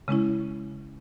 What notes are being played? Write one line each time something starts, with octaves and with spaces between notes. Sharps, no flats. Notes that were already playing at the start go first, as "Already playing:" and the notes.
C#3 G#3 C#4 E4